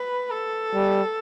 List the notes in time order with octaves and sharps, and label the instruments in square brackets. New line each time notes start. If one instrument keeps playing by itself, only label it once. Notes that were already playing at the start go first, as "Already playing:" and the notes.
Already playing: [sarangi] B4
A4
[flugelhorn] G3